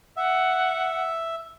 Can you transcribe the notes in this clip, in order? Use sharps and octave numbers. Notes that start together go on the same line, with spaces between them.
E5 F#5